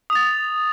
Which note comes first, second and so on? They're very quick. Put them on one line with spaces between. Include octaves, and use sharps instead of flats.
D#6 F7 A6